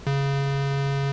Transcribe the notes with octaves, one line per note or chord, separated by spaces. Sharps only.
C#3